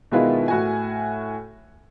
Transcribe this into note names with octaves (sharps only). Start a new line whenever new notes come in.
B2 D#3 G#3 E4 F4 B4
A2 F#4 G#5